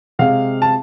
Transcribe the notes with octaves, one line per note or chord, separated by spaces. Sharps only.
C3 G#3 F5
A5